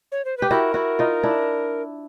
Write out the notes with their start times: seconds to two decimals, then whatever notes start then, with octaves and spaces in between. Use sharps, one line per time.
0.12 C#5
0.25 C5
0.37 G4 B4
0.50 E4 F#4 A#4
0.74 E4 F#4
0.99 D#4 F4
1.23 D4 E4